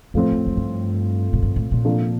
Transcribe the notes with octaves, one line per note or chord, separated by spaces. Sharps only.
F2 A2 F3 A3 C4
F2
F2
G2
A2
G2
A2
A#2
C3 F3 A#3 D4 A4